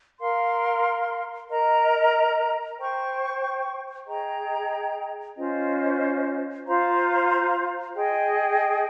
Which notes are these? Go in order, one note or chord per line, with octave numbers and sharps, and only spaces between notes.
A#4 F5 C6
A#4 D#5 A#5
C5 G5 C#6
G#4 D#5 G5 A#5
C#4 F4 C5 D#5
F4 C5 F5 A#5
G#4 D#5 G5